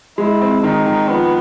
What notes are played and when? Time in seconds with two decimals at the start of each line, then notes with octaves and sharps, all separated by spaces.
0.18 G#3 E4
0.41 C4
0.63 D#3 D#4
0.86 D#3
1.09 F3 B3